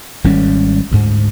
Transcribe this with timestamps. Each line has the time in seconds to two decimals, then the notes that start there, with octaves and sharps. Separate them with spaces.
0.24 G#1 G3 C#4
0.92 D2 G#2